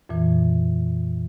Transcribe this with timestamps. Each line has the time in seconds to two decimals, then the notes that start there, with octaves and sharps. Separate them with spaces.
0.09 F2 A#2 E3